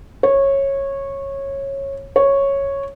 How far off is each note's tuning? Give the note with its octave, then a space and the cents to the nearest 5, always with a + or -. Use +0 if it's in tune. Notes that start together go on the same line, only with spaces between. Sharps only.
C#5 -15
C#5 -5